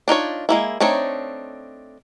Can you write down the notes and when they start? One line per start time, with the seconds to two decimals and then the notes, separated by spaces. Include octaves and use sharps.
0.08 D4 D#4 F4 C#5
0.49 G#3 A#3 E4
0.80 A3 C4 D4 D#4 C#5